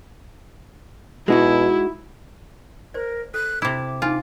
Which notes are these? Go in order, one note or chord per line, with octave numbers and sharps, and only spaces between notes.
B2 G#3 D#4 E4 F#4
A#4 C5 D5
A4 F#6
C3 E4 D6
D4 D#4 F4 G#5